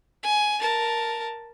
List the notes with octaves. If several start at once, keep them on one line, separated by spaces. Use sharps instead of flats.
G#5
A#4 A5